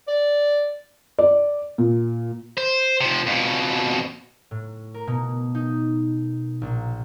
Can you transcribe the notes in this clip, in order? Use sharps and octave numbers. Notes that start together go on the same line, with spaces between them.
D5
D5
A#2
C5
C3 F3
F2 B2
A2
A#4
B2
D#4
A#1